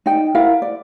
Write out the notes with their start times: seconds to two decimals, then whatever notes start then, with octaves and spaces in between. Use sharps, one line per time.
0.06 D#4 D5 G5
0.35 E4 A#4 F5 F#5
0.62 D5